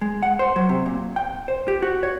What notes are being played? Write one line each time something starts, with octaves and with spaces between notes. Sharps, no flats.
G#3
F#5
C5
F#3
C3
A#2
G5
C5
G4
F#4
C#5